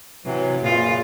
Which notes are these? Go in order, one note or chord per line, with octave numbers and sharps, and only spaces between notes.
C3 E3 F#3
F#2 A#2 C#3 F4